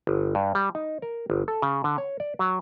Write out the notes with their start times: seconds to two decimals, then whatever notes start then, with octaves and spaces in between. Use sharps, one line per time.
0.07 G1
0.35 G2
0.55 G3
0.75 D#4
1.02 A#4
1.30 G1
1.48 A4
1.62 C#3
1.84 D3
1.98 C#5
2.20 D5
2.39 F#3